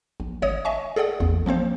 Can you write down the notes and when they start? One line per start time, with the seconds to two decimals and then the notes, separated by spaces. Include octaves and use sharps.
0.20 A#1
0.42 G#1 C#5 D#5 D#6
0.65 D#5 E5 G#5 C#6
0.96 G#4 A4 D5 F#5 D#6
1.20 A1 E2
1.46 F3 A#3 C4 C5